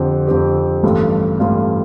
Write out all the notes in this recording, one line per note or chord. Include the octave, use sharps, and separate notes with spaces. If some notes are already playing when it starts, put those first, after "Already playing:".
Already playing: F2 D3 F3 C4 G4
F2 D3 F3 C4 G4
A1 G2 G3 F4 A4
A1 G2 G3 F4 A4